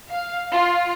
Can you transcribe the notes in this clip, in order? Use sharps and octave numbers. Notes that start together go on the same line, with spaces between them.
F5
F4